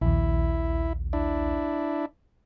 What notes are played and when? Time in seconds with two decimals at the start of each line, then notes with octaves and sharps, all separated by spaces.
0.01 A#1 D#2 E4
1.13 D4 E4